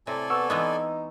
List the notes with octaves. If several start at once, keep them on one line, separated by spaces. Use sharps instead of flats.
A2 C3 A4 D5 G#5
B3 C#6 E6
E3 G#3 B3 D#4